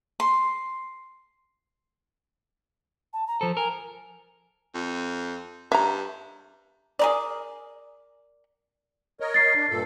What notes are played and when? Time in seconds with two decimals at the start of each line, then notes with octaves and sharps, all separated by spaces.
0.20 C6
3.13 A5
3.27 A#5
3.41 F3 A4 C5
3.57 A#4 G#5
4.75 F2
5.72 G2 E5 A#5
6.99 G#4 A#4 D5
9.20 A#4 C#5 D#5
9.34 A6 C7
9.55 D4
9.70 G2 A#2 A4